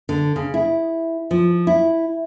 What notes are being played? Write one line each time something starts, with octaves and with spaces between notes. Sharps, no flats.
D3
C#3
E4
F3
E4